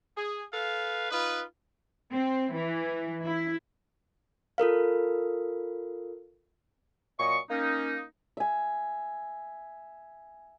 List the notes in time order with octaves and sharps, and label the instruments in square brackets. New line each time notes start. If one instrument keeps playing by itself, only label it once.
[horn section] G#4
A4 B4 F5
D#4 F4 B4
[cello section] C4
E3
E4
[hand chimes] F4 A4 A#4 F5
[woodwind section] A#2 F#3 D#5 C#6
A#3 C#4 D#4
[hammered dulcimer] E5 G#5